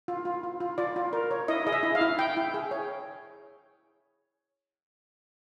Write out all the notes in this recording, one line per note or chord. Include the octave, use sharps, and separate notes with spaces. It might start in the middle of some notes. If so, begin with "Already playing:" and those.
F4
F4
F4
F4
F4 D5
F4
A#4
C#5
E4 D#5
G#4 D#5
E5
E4
F5
E4
E4 G5
E4
G#4
C#5